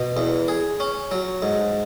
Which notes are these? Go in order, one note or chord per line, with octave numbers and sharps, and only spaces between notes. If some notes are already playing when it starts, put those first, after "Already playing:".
Already playing: B2
E2
G#4
C#4
F#3
G#2